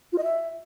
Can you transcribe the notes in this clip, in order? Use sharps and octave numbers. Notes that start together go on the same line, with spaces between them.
F4
D#5
E5